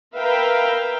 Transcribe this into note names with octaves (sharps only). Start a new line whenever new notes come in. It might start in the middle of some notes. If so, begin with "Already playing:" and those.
A#4 B4 E5 F5 G5 A#5